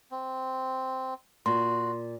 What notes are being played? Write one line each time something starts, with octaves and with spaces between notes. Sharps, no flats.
C4
A#2 F#4 C6